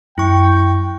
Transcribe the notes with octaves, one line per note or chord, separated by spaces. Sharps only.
F#2 E4 G5 C#6